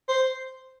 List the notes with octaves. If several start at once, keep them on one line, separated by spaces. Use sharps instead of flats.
C5